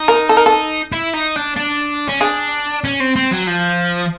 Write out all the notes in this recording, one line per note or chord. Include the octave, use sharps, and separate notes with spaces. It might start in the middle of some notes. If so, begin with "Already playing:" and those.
Already playing: D#4
A#4
A4
A#4
A4
E4
D#4
D4
D4
C#4
D4 G#4
C#4
C4
C4
F#3
F3